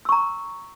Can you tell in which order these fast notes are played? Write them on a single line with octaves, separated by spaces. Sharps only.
E6 C#6 A#5